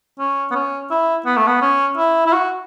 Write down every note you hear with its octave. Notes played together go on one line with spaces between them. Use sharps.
C#4
B3
C#4
E4
B3
A3
B3
C#4
E4
E4
F#4